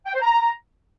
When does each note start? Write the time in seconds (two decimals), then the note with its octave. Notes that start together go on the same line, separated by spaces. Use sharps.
0.06 G5
0.14 C5
0.21 A#5